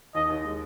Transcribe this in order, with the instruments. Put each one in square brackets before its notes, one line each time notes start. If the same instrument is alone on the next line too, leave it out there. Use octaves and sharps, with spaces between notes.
[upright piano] D#2 [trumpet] D#5
[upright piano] D#2
G#3